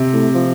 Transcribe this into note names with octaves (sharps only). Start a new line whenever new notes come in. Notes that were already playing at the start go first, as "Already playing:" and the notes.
Already playing: C3
A2
F3